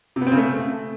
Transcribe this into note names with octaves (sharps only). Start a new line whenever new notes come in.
C3
B3
C4
C#3
A3